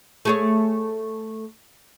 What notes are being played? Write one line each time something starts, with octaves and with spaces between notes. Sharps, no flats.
A3 G#4 C#5